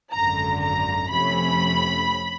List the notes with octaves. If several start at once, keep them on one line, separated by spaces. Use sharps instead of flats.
G#1 F#2 D3 A#5
A#5
F2 C3 F3 A3 C#4 B5